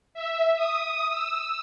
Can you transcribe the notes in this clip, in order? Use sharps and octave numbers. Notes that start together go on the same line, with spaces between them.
E5
D#6
E6